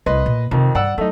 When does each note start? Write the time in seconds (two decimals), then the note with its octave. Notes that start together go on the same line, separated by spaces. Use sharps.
0.06 C2 B4 D#5 C6
0.26 A#2
0.51 F2 C3 D#3
0.75 G2 D5 F#5 E6
0.98 F#3 A3 D#4